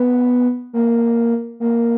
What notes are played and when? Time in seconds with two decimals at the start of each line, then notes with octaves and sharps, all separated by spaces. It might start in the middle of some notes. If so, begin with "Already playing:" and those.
Already playing: B3
0.73 A#3
1.60 A#3